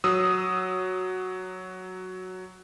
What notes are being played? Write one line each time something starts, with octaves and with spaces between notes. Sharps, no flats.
F#3 D#6 E6